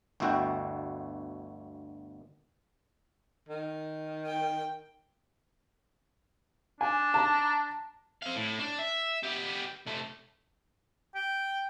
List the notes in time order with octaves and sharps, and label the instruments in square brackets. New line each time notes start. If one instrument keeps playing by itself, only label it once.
[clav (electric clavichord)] G1 D2 B2 E4 F#4 G5
[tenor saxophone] D#3
[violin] G5
[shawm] D4 [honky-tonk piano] G#5
[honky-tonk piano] A5 A#5
[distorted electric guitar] C4 F5
A2
D4
E5
B3 G4
C3 A3
[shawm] G5